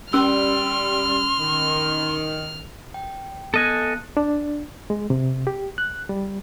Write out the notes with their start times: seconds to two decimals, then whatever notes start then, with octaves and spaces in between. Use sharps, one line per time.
0.13 G3 C#4 C6 E6 F6
1.39 D#3
2.94 G5
3.54 B3 A4 D#5 G#5 F#6
4.17 D4
4.90 G#3
5.10 C3
5.47 G4
5.78 F#6
6.09 G3